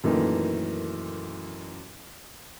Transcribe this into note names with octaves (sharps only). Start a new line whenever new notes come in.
F#2 A#2 D#3 E3 A3 D#4